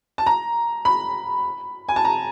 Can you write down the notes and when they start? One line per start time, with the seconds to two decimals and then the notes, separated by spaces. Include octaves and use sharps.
0.18 A5
0.26 A#5
0.85 B5
1.89 G#5
1.96 A5
2.05 A#5